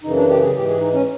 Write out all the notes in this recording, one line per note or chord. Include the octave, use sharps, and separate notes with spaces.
F#2 C#3 E3 D#4
D4
G4
G#4
G#2 E3 G4
G#4
D#4
C#4